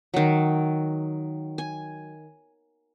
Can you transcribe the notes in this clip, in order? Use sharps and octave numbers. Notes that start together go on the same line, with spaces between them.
D#3 F#3
G#5